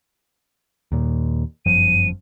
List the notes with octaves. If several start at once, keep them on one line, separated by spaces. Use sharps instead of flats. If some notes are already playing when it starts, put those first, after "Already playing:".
D#2 A#2
G1 F#2 F3 D#7